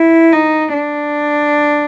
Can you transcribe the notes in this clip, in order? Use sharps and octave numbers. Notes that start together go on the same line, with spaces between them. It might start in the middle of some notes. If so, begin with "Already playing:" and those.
Already playing: E4
D#4
D4